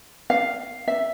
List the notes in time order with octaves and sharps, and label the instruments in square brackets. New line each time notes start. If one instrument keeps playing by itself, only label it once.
[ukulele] F5
E5